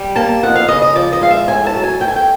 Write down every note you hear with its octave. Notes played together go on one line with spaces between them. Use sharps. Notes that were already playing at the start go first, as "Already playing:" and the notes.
Already playing: G3
A#3 A5
F2 F#5
F5
C#3 D#5
D#5
F3 D5
D#5
G#3 F5
E5
A2 G#5
A5
F#3
G#5
A3 G5
G#5
G5